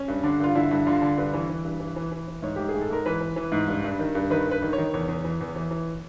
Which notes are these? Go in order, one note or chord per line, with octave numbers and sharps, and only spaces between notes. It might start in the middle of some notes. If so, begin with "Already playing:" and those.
Already playing: C#4
G2
D3 D4
G2 F4
D3 E4
G2
D3 F4
D3
G2 B4
E3
E3
G2
E3
E3
E3
E3
G#2 C#5
G#2 G4
G#4
G#2
A4
G#2 A#4
E3 B4
E3
E3
G#2
G2
G2
D#3
G2
D#3 B4
G2
B4
D#3
C#5
D#3
E2 C#5
E2
E3
E2
E3
E3